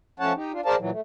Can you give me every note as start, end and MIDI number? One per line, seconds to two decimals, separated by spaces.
0.20 0.33 53
0.20 0.33 57
0.20 0.33 61
0.20 0.33 73
0.20 0.33 78
0.20 0.33 81
0.35 0.52 63
0.35 0.52 67
0.52 0.61 62
0.52 0.61 65
0.66 0.76 68
0.66 0.76 70
0.66 0.76 72
0.66 0.76 74
0.66 0.76 77
0.66 0.76 81
0.79 0.90 46
0.79 0.90 52
0.79 0.90 54
0.91 1.01 57